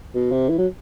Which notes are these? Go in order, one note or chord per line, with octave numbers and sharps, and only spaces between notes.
B2
C3
E3
F#3